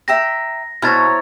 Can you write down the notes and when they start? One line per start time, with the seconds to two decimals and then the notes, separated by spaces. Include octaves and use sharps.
0.08 E5 G5 A#5 A#6
0.82 B2 E4 C5 C#5 A#5 F6 G#6 A6